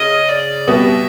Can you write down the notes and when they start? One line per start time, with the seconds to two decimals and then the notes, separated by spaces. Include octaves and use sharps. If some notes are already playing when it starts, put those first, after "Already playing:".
Already playing: C#3 D#5
0.29 D5
0.67 B2 G3 B3 E5